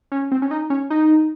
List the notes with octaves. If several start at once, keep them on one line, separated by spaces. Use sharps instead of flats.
C#4
C4
C#4
D#4
C#4
D#4